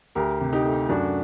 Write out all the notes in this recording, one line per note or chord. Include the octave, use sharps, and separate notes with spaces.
D2 G4 A#4
C3
D#4 G4
A3
F#2 D4 F#4